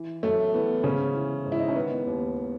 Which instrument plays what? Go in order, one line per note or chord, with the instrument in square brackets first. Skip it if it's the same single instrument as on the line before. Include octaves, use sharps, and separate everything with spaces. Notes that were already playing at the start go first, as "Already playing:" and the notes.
Already playing: [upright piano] E3
F#2 A3
E3 B3
G#2 C#3 C#4
E3
G#2
E4
D#4
C#4
D#3 B3
D#2